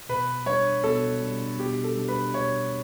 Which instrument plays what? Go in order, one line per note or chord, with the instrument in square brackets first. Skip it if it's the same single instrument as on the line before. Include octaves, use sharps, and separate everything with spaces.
[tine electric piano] B2 [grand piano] B4
[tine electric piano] G3 D4 [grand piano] C#5
[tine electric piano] B2 [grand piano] A4
[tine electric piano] G3 D4
[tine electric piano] B2 [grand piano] G4
[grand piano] A4
[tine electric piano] G3 D4
[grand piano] B4
[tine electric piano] B2 [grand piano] C#5